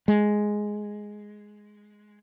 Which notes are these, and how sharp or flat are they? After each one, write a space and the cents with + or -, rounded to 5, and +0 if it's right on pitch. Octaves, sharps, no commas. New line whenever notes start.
G#3 +5